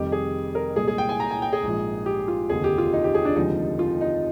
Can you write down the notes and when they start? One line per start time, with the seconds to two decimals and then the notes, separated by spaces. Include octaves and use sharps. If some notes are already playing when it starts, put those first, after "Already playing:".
Already playing: F1 F2 D#3 G3 G4
0.12 G#4
0.55 A#4
0.76 C2 A#2 G#3 G#4
0.88 G#4
0.98 G5
1.09 G#5
1.20 A#5
1.31 G#5
1.42 G5
1.53 G#4
1.63 A#1 G#2 F3
2.06 G4
2.28 F4
2.49 F1 D#2 D3 G#4
2.64 G4
2.78 F4
2.93 D#4
3.04 G4
3.14 G#4
3.25 D4
3.35 F1 D#2 D3 F3 G#3 D#4
3.79 F4
4.01 D#4